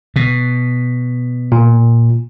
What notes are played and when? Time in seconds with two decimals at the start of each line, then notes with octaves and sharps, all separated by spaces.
0.16 B2
1.52 A#2